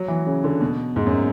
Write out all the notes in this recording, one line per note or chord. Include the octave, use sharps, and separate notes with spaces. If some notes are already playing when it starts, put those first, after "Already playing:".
Already playing: F#3
E3
C#3
D3
B2
G#2
F#2